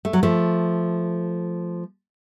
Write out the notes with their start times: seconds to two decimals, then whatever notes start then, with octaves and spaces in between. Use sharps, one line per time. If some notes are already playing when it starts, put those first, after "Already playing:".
0.05 A3
0.13 F#3
0.23 F3 A3